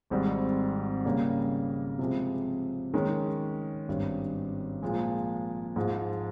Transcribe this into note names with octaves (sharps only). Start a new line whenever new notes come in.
G#1 G#2 G3 C4
C#3 G3 A#3
C3 F3 G#3
D#3 G#3 C#4
G#1 G2 G3 C#4
A#2 F3 G#3
G#2 F3 G#3